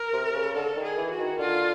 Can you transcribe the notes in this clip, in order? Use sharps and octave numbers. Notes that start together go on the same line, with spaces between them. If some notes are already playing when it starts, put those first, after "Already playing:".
Already playing: A#4
C3
C#3
D3 A4
D#3
G#4
E3
F#4
D#3
D3 F4